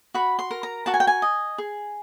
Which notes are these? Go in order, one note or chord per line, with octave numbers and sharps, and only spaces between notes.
F#4 B5
C6
A#4
A#5
F#4 A5
G#5
G5
G#5
D#5
G#4